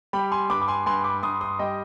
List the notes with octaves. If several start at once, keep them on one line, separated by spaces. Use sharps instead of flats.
G3 G5 B5
G#5 C6
G2 B5 D6
D6
G#5 C6
G2 G#5 C6
B5 D6
G2 C6 D#6
C6 D#6
G3 D#5 G5